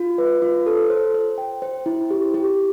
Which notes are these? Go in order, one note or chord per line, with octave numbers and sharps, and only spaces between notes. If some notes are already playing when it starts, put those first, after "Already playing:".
Already playing: F4
B4
F4
A4
C5
C5
G5
C5
E4
G4
G4